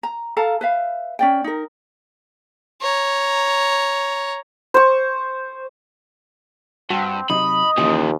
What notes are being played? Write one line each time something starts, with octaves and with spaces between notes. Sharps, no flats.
A#5
A4 F5 A5 A#5
B4 E5 F5
C#4 D5 G5
D#4 A#4
C#5 A#5
C5 C#6
G2 C4 F#4
C3 F#3 D#4 D#5 B5
D#2 A#2 C#3 E3 F3 G4